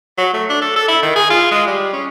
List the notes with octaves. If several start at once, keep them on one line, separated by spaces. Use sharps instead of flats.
F#3
A3
D4
A4
A4
E4
D#3
G#4
F4
G#3
G3
C#4